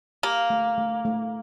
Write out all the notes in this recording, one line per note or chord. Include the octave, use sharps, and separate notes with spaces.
A#3 G4
A3
A3
A3